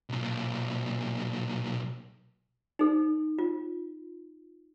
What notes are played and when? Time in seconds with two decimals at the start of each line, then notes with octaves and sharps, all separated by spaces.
0.09 B1 A#2
2.79 D#4 A4
3.39 F4